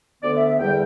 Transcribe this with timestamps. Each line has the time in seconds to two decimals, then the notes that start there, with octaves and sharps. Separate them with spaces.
0.22 D2 D3 B3 D5
0.35 E5
0.47 E5
0.59 E2 D3 G3 G5